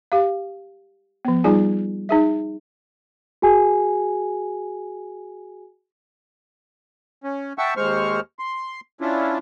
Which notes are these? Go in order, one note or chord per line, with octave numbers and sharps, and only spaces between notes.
G4 F5
F3 B3
G3 D#4 F4 G#4 G#5
D#4 G#4 E5
F#4 G#4 G#5
C#4
E5 F#5 G5 A5 C#6 E6
D#2 G#3 C5 C#6 F6
C6
C#4 D4 E4 F4